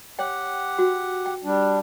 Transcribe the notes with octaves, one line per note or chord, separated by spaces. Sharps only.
G4 C#5 F#5 G5
F#4
G5
G3 D4